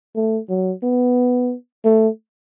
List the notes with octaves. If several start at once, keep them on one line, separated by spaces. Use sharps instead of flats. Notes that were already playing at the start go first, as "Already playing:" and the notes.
A3
F#3
B3
A3